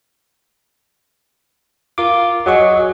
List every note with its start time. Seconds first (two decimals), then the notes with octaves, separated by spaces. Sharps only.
1.98 F4 A#4 D6
2.46 F#3 F#4 G#4 D#5 C#6